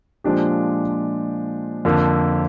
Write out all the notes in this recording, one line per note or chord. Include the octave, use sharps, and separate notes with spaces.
A#2 F3 G#3 D4 G4
F2 D3 F3 A#3